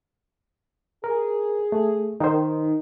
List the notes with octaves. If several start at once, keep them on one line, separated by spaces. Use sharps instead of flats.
G#4 A#4
A3
D#3 D#4 C5